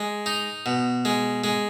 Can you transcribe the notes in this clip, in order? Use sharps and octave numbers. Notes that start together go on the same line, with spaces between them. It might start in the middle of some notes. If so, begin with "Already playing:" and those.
Already playing: G#3
D#4
B2
G#3
G#3